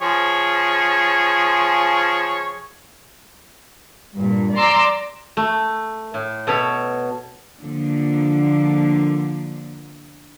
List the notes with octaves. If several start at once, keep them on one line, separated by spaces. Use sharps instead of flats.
F3 G#4 C#5
G2 A#2
D5 A#5 C6 D6 E6
A3
A2
B2 A4 C#5 B5
D3 F3 A#3